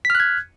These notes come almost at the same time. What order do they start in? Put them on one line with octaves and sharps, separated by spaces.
B6 F6 F#6 G#6